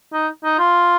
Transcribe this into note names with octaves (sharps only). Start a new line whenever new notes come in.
D#4
D#4
F4